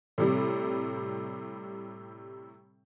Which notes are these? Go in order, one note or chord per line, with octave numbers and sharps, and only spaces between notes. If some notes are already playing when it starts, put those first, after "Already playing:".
A2 C3 G3